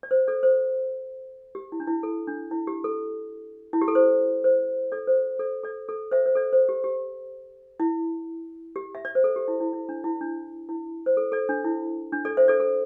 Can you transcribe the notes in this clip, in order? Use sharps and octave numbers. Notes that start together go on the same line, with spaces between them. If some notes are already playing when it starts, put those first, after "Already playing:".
D5
C5
A4 D5
C5
G4
E4
D4
E4
A4
D4
E4
G4
A4
E4
G4
A4
C5
C5
A4 D5
C5
A4 D5
A4 D5
A4 D5
C5 E5
C5
A4 D5
C5
G4
G4
E4
G4
E5
D5
C5
A4
G4
E4
E4
E4
D4
E4
D4
E4
C5
A4
A4 D5
D4
E4
D4
A4 D5
C5 E5
A4 D5
A4